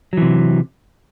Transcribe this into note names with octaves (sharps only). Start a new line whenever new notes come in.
C3 E3 F#3